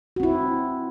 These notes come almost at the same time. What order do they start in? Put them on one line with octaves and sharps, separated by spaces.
F#4 C4 E4